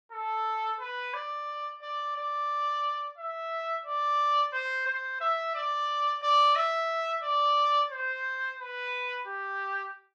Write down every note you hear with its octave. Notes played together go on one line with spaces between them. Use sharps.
A4
B4
D5
D5
D5
E5
D5
C5
C5
E5
D5
D5
E5
D5
C5
B4
G4